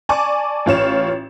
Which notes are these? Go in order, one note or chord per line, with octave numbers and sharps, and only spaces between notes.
D5 G#5 A5 C#6 D6
A1 F4 C#5 E7